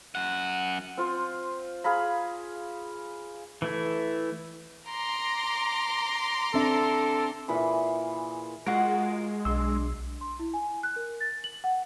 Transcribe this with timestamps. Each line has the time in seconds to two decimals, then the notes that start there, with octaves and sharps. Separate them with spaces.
0.15 F#2 F#5
0.97 C4 F4 C5
1.84 G#4 F5 A#5 B5
3.62 E3 A3 E4
4.88 A#5 C6 D6
6.54 C4 D4 A4 E5
7.48 A#2 E3 G#4 B5
8.67 G#3 F4 F#4 A#4 F#5
9.45 B1 D4 C6 E6
10.21 C6
10.39 E4
10.54 G#5
10.83 F#6
10.96 A#4
11.21 A6
11.44 F#7
11.64 F#5